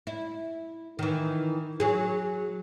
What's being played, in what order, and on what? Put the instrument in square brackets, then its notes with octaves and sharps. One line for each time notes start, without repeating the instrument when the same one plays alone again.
[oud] E4
D#3 E3
F#3 G#4